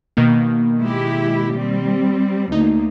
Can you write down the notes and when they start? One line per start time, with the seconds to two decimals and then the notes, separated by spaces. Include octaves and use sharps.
0.17 B2 D#3 A#3
0.82 G#3 E4 G4
1.54 G3 C4
2.52 D2 A#3 D#4